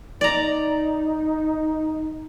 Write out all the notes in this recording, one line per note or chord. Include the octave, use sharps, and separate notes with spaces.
D#4 D5 A#5